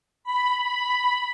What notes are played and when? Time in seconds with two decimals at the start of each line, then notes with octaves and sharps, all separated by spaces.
0.24 B5
0.63 B5